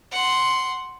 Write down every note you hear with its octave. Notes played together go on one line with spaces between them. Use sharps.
F#5 C6